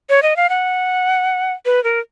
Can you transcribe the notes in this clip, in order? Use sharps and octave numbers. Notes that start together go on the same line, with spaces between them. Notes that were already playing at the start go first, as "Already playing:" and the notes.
C#5
D#5
F5
F#5
B4
A#4